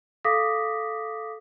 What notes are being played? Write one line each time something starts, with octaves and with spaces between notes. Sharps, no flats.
A4 F5 D6 D#6 A#6 B6